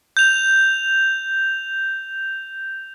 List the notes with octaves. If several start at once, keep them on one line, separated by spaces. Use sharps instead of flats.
G6 F7